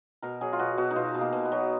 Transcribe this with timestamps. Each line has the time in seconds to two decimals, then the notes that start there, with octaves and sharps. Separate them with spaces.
0.22 B2 A#4
0.41 F#3 G#4
0.53 F4
0.59 B2 F#4
0.77 B2 F#4
0.91 D#4
0.96 B2 F4
1.15 B2
1.21 A#3
1.33 B2
1.45 B3
1.52 F#3